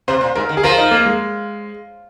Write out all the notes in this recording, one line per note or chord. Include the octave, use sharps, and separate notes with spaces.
C3 C5
A#2
G#2 A#4
D#3
G#4
F3 A#4
D#4
A#3
G#3